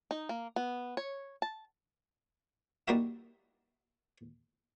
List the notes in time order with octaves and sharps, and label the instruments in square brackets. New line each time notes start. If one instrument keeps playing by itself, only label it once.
[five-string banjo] D#4
A#3
B3
C#5
A5
[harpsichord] G3 A#3 D#4 E4 F#4 E5